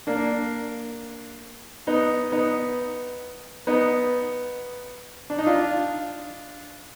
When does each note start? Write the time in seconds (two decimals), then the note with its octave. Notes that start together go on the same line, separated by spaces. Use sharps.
0.07 A#3 D4
1.87 B3 D#4
2.32 B3 D#4
3.67 B3 D#4
5.30 D4
5.38 D#4
5.46 D4 F4